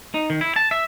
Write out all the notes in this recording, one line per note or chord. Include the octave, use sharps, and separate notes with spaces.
D#4
D#3
E4
A5
E5